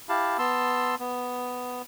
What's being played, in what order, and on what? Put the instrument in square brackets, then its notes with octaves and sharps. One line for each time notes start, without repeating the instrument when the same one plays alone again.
[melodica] E4 G4 F5 A5
B3 A5 C6 E6
B3